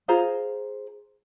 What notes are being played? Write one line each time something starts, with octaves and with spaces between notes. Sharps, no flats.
F4 G#4 C5 A#5